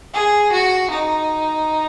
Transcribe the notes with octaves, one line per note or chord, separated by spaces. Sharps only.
G#4
F#4
D#4